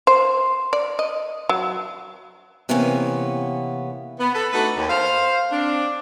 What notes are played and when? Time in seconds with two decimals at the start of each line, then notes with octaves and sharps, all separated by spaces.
0.07 C5
0.73 D5
0.99 D#5
1.49 F#3
2.69 C3 E3 A#3 B3 C#4
4.19 B3
4.34 A4 B4
4.53 A3 D4 D#4 F#4 A4 B4
4.77 D#2
4.88 C5 F5
5.52 C4 D4